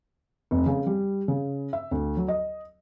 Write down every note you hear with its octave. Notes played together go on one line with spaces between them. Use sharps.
F1
C#3
G3
C#3
E5
D2
F#3
D#5